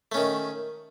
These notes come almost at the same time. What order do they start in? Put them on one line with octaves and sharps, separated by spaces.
A3 C#4 D#3